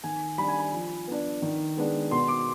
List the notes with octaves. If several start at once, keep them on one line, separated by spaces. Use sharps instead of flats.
D#3 G#5
G3 D4 B5
G#5
B5
F3
B3 D4
D#3
G#3 B3 D4
B2 C6
D6